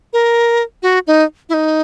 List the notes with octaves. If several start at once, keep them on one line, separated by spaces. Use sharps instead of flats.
A#4
F#4
D#4
E4
D#4